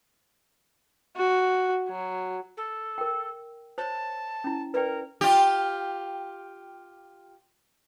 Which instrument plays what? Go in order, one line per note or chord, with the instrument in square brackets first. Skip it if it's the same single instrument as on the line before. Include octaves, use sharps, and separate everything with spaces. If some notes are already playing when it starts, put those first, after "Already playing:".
[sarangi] F#4
F#3
[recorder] A4
[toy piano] A#4 G5
[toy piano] C5 C#5 [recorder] A5
[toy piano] C#4 E4
[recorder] A#4 [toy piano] B4 D5 G5
[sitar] F4 G4